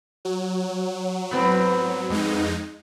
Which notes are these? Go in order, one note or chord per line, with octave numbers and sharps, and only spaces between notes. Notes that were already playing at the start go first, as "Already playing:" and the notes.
F#3
G#2 B3 C4
F2 G#3 D#4